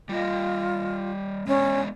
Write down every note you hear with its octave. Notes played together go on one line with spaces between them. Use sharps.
G3 A#3 F4 D#5
G#3 B3 C#4 D4